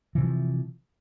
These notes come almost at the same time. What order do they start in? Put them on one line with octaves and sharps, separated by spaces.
E3 C3 F3